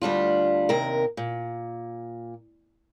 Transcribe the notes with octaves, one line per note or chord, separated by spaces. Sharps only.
D2 G3 D4 F4
D#2 C3 A#4
A#2